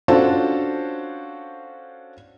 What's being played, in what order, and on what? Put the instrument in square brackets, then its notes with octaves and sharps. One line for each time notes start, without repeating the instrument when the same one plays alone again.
[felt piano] C#4 D4 F4 F#4 A4 C5